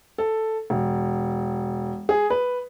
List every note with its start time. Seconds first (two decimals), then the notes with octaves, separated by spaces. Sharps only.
0.18 A4
0.70 E1
2.09 G#4
2.30 B4